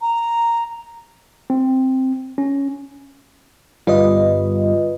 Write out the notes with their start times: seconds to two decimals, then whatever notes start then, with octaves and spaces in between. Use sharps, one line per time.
0.01 A#5
1.50 C4
2.38 C#4
3.87 G1 G3 F4 B4 D#5